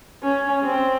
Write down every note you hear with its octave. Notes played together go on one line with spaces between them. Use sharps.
C#4
C4